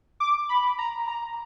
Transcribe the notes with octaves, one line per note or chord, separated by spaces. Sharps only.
D6
B5
A#5
A#5